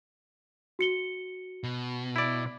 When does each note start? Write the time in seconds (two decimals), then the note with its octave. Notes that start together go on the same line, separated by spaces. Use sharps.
0.79 F#4 C#7 G7
1.64 B2
2.16 E4 D5